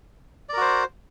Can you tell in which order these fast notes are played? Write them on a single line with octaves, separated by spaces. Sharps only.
D5 A#4 F#4 C5